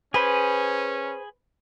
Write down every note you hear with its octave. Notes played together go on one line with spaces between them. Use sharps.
C#4 G#4 B4 C5 B5